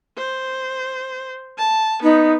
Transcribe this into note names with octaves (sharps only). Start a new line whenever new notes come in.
C5
A5
B3 D#4